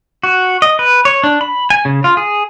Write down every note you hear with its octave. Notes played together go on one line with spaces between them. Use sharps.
F#4
D#5
B4
C#5
D4
B5
G#5
C#3
F4
G#4